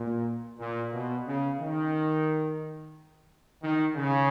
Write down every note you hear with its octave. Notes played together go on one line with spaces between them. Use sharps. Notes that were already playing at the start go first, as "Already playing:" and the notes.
Already playing: A#2
A#2
B2
C#3
D#3
D#3
C#3